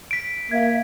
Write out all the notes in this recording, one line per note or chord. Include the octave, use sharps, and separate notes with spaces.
B6 D7
A#3 E5 F5 G#6